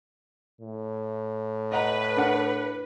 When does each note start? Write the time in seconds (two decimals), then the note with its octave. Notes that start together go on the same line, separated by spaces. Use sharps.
0.61 A2
1.72 B4 D#5 F#5 A#5
2.17 D4 A#4 F#5